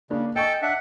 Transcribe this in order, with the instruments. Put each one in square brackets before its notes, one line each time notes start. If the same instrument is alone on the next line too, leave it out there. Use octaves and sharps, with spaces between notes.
[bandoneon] C#3 [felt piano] A#3 D4
[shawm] A4 [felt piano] D#5 G#5 C#6 [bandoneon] G5
[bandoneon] D4 E5 [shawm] F#5